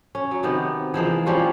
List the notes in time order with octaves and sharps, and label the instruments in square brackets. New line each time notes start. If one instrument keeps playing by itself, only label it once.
[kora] C#4
F#3
C3 D#3 B3
E3 F3 G#3 A#3
F3 G3 C#4 F4